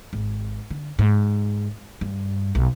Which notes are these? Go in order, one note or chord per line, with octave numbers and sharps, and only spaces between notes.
G#1
D3
G#2
G2
B1